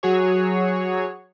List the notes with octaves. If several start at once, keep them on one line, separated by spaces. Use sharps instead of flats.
F#3 F#4 G#4 C#5